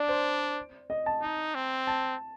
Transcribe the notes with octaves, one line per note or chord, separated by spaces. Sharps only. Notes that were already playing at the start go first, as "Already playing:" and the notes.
Already playing: D4 D5
C5
D#5
A5
D#4
C4
A5